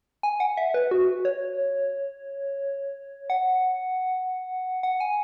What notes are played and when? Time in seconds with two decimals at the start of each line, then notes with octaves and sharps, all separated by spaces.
0.23 G#5
0.40 F#5
0.57 E5
0.74 B4
0.91 F#4
1.25 C#5
3.30 F#5
4.83 F#5
5.00 G#5